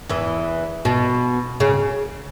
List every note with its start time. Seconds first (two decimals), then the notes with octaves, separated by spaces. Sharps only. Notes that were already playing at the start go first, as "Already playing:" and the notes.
0.09 E2 E3
0.85 B2
1.60 C#3